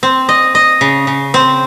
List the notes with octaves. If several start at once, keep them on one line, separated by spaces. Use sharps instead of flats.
C4
D#5
D#5
C#3
C#3
C4